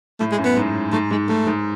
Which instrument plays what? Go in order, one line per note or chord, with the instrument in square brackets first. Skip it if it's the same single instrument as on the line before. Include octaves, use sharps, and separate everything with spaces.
[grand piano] A2 [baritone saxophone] A3
[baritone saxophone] G#3
[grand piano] F#2
[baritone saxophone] B3
[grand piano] G#2
[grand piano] G#2 [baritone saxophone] A3
[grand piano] G#2 [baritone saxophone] G#3
[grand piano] G#2 [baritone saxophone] A3
[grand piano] G#2